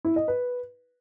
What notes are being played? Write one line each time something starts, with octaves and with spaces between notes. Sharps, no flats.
E4
D#5
B4